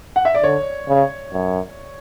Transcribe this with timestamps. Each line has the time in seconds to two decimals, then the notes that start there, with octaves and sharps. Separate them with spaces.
0.16 F#5
0.25 E5
0.35 D5
0.43 D3 C#5
0.89 C#3
1.33 F#2